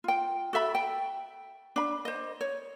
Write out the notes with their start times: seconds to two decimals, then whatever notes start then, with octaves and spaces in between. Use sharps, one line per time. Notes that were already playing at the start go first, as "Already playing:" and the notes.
0.04 F4 G5
0.53 F#4 A4 E5 B5
0.75 G5
1.76 D4 B5
2.05 C5 D#5
2.41 C#5